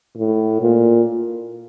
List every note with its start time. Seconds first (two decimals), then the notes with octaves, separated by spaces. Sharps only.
0.16 A2
0.62 A#2